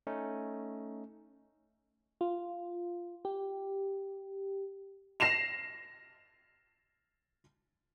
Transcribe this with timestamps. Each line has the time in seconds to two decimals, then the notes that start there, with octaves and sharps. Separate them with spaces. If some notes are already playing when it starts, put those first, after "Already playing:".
0.07 A3 C#4 D#4
2.21 F4
3.25 G4
5.20 A#6 C7 E7 F7